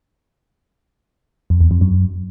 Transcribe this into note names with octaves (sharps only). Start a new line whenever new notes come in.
F2
E2
F2
F#2